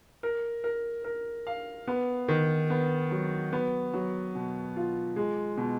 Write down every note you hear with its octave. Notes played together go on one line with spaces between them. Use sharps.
A#4
A#4
A#4
F5
B3
D#3
B3
F#3
B3
F#3
B2
F4
G#3
B2